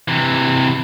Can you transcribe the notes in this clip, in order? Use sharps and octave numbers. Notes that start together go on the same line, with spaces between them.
C3 E3